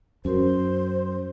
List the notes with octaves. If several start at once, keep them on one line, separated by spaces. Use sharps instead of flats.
F#2 C#4 F#4 A#4 C5